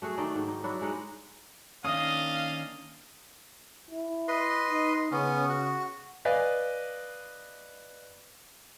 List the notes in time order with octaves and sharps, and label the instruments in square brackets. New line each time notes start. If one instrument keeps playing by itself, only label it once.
[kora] A3 F#4 G#4
D#3 A3 D#4 D5
G#2
D#4
F#3 D4 E4 F#4
G#3 D#4 F#5
[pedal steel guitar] D#3 A#3 C#4 [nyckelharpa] D4 D#5 [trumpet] F5 [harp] D#6
[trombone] E4
[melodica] B4 D#5 C6
[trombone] D#4
[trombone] C#3 [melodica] B3 C#4
[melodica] F#4
[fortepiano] B4 D5 D#5 F5 G#5